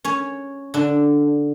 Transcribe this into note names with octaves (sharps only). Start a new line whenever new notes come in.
C#4 C#5
D3 D4